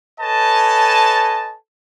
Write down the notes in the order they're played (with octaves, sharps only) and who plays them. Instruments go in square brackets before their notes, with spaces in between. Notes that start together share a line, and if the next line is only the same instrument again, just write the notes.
[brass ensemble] A4 B4 C#5 D#5 G#5 A5